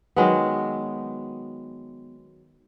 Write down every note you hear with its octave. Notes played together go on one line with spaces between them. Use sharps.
D#3 F#3 G#3 B3